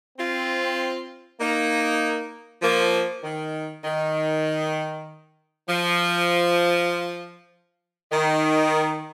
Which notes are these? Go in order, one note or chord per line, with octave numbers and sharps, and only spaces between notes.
C4 F4
A#3 D#4
F3 A#3
D#3
D#3
F3
D#3